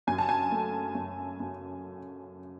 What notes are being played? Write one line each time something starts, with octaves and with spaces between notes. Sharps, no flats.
F#2 G#5
A5
G#5
A3
F#2
F#2